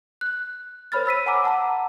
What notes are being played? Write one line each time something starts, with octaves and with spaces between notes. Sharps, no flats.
F#6
A#4 C5 C#5 B5 F6 A6
B5 E6 B6 D#7
F#5 G#5 A#5 D6 E6
F#5 A5 A#5 E6